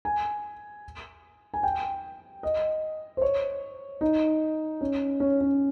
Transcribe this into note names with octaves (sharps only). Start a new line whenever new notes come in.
G#5
G#5
G5
D#5
C5
C#5
D#4
C#4
C#4
C#4